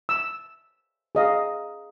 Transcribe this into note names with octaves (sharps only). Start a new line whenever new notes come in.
E6
G#4 D#5 F5